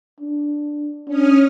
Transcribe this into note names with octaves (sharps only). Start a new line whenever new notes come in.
D4
C#4 D4 D#6 F6